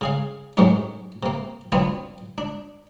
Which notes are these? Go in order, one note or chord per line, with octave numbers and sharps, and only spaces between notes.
C#3 G#4 F5
F#2 A2 C3 F#3 G#3 D#4
C3 A#3
F#3 B3 C4 D4 F4
D4